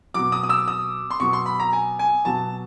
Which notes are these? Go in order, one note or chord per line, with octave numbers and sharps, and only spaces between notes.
B2 F#3 D6
D#6
D#6
E6
D#6
C6
B2 F#3 C#6
C6
B5
A#5
G#5
G#5
B2 F#3 A5